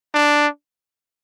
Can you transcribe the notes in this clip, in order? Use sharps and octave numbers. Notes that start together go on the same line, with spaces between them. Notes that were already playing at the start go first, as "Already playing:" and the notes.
D4